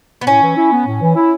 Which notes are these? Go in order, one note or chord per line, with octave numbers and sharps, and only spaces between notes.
B3
A2 C#4
E3
E4
B3
A2
E3
E4